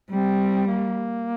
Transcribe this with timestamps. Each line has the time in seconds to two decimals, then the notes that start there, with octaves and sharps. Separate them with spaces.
0.10 G3 C4
0.67 A#3